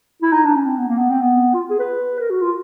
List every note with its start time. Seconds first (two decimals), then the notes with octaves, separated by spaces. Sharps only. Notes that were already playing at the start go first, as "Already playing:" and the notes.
0.22 E4
0.33 D#4
0.45 D4
0.55 C#4
0.66 C4
0.78 B3
0.88 A#3
0.99 B3
1.10 C4
1.21 B3
1.54 F4
1.70 G#4
1.79 B4
2.20 A#4
2.30 F#4
2.41 F4